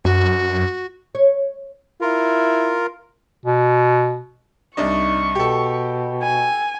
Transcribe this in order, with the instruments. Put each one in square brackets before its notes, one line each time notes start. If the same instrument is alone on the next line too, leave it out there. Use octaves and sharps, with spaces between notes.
[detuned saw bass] F#2 [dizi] F#4
[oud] C#5
[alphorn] E4 [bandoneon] F4 A#4
[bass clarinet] B2
[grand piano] C2 D4 D#5 [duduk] D#4 [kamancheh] C#6
[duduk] B2 [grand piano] G4 A4
[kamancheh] G#5